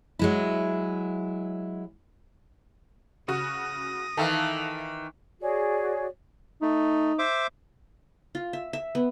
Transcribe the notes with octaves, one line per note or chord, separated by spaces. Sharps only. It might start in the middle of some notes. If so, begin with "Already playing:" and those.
F#3 G#3 E4
C#3 F#4 D#6 A#6
D#3 E3 A4 E5 F5
F#4 G#4 C#5 D5
A3 D#4
C5 E5 D6
F4
E5
E5
B3